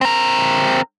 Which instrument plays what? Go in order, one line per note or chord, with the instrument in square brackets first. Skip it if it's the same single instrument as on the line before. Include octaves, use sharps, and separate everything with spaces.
[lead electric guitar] C4 A#4